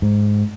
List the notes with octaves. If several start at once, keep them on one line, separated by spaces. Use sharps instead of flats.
G#2